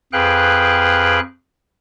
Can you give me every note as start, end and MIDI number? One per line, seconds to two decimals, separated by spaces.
0.13 1.20 41
0.13 1.20 68
0.13 1.20 71
0.13 1.20 77
0.13 1.20 79
0.13 1.20 90